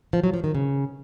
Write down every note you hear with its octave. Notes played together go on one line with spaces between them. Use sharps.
F3
F#3
F3
D#3
C#3